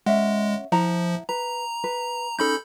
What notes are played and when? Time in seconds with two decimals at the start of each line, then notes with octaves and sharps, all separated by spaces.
0.06 G#3 C#4 E5 F#5
0.72 F3 E4 F#5 A#5
1.29 B4 A#5
1.84 B4
2.39 C#4 D#4 G#4 A4 B5 G6